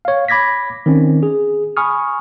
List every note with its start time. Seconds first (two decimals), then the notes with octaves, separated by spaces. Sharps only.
0.05 C#5 F5
0.28 B5 D6 G#6 A#6 B6
0.86 D#3 C4 C#4
1.23 G#4
1.77 G#5 B5 C#6 D#6 F6